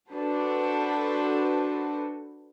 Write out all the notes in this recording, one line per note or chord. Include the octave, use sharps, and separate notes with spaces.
D4 F#4 A4 B4 C5